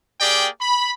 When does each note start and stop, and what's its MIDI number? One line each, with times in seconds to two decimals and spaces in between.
0.20 0.47 58
0.20 0.47 67
0.20 0.47 68
0.20 0.47 74
0.20 0.47 79
0.60 0.91 83